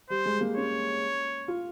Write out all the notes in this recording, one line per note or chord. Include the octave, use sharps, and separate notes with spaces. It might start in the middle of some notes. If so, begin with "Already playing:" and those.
G3 C5
G#3
A#3
C#4 C#5
F4